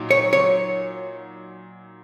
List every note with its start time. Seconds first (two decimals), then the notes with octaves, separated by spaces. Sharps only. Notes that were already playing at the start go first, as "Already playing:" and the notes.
Already playing: A#2 F#3 D#4
0.11 C#5
0.33 C#5